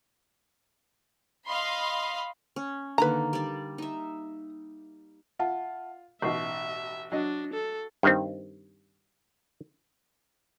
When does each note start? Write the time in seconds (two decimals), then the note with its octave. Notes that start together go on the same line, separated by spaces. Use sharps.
1.46 D#5 F5 B5 C6
2.56 C#4
2.98 D3 D#3 A#3 B4 A#5
3.33 G3 D5
3.78 D#4 E5
5.39 F4 E5 F#5 A5
6.22 A1 B2 D#4 E5 C#6 C7
7.12 F#3 D4 D#5
7.53 A4
8.03 G2 D#3 C4